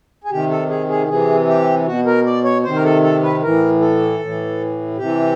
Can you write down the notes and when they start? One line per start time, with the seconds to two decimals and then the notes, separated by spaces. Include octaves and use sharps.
0.24 G#4
0.31 C3 D#3 G4
0.50 A4
0.69 G#4
0.89 G#4
1.08 C3 E3 G#4
1.48 G4
1.86 B2 F#4
2.06 A#4
2.26 D5
2.44 C#5
2.64 C3 D#3 C5
2.75 A#4
2.84 A4
3.03 A4
3.23 B4
3.43 A2 E3 A#4
3.81 A4
4.19 A2
4.25 E3
4.97 C3 E3 G4